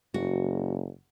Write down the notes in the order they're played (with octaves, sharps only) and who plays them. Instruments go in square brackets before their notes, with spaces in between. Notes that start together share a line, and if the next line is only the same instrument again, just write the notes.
[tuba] F#1 [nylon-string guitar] F#4